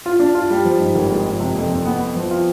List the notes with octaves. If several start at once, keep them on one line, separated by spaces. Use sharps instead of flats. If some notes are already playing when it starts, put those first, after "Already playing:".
F4
D4
F4
G3
F3
G#2
G#1
G#3
F3
C3
F2
F2
B3
B3
F3
F4